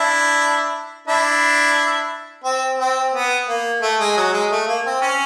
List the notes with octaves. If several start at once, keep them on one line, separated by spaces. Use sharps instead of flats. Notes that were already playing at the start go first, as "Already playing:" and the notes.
Already playing: D4 E4
D4 E4
C4
C4
B3
A#3
A3
G#3
F#3
G#3
A3
A#3
C4
C#4